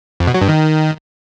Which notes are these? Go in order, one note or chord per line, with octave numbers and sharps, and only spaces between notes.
F2
B2
F#3
G2
D#3